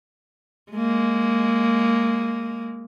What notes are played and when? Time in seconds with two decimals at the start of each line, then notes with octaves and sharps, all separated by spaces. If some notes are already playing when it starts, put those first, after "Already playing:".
0.72 G#3 A#3